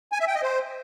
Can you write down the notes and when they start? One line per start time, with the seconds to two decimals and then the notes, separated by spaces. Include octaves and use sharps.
0.12 G#5
0.20 E5
0.27 G5
0.35 D#5
0.43 C5